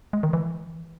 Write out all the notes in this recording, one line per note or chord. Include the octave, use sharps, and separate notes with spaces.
G#3
D#3
E3